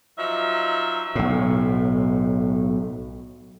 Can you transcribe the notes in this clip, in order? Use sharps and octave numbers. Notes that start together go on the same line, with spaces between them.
F3 F#3 D#4 E5
B1 A2